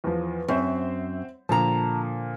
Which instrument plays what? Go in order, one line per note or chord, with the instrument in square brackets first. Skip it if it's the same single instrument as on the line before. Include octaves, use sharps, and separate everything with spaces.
[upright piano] E2 F3
[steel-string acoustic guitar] F#2 [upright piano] C4 C5 E5
[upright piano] A#2 D3 F3 [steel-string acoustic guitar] A5 A#5